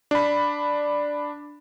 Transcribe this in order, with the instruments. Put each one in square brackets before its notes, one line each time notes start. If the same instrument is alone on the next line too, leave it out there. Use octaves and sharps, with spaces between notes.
[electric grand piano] D4 B5